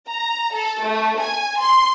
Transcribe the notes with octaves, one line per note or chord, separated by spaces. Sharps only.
A#5
A4
A3
G#5
C6